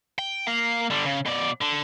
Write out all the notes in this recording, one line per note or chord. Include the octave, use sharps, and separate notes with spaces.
G5
A#3 F5
D3 G3
C#3
B2 D5
D3